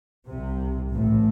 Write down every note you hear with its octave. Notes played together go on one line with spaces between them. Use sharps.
C2 C3
A1 A2